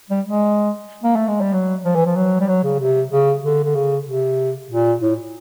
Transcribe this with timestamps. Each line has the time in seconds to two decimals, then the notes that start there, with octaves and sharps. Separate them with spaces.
0.10 G3
0.26 G#3
1.03 A#3
1.16 A3
1.28 G#3
1.41 G3
1.53 F#3
1.85 F3
1.95 E3
2.06 F3
2.16 F#3
2.40 G3
2.48 F#3
2.64 C#3
2.80 C3
3.11 C#3
3.43 D3
3.64 D3
3.75 C#3
4.07 C3
4.71 A#2
5.02 A2